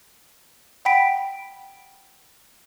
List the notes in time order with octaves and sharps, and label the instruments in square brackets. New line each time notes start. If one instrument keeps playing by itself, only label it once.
[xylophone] F#5 G5 B5 B6 D7